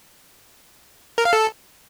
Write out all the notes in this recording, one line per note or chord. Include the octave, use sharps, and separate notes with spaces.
A#4
F5
A4